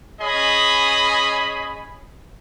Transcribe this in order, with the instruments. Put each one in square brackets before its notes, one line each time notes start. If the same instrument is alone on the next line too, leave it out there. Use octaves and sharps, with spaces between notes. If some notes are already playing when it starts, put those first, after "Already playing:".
[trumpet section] C#4 G#4 D#5 B5